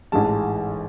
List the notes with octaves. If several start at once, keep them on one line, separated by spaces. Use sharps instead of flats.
A1 G#2 E3 G#3 A5